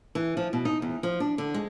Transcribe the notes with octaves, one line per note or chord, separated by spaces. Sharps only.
E3
F3
B2
D#4
E2
F3
D4
D3
G#3